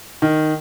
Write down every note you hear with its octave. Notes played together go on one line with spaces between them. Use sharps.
D#3